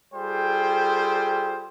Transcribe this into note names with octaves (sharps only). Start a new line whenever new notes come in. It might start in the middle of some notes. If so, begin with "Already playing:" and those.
G3 F4 G#4 A4 C5 G5